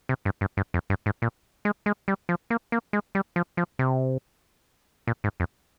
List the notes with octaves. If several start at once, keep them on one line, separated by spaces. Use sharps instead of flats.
C3
G2
G2
G2
F2
G2
G#2
A#2
G#3
G#3
G3
F3
A#3
A#3
G#3
G3
F3
F3
C3
A#2
G#2
F2